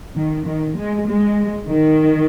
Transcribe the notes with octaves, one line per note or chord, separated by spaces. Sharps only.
D#3
D#3
G#3
G#3
D#3